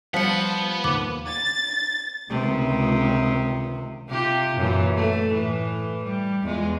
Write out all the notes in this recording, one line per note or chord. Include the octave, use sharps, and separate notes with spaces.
F3 G3 B3 F#5 B6 C#7
D#2 B5 D6
A6
C#2 C3 D#3
C3 F4 G4
F#2 A#2 E3
A3
A2 E3
G3
E2 G#3 F4